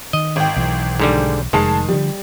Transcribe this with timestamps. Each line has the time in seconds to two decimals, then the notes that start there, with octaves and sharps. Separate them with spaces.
0.13 D#3 D#5
0.36 G#1 G5
0.56 B1 E3
1.00 G#2 D3 G3
1.53 F1 D#3 G#3 A5 C7
1.88 D3 F3 G3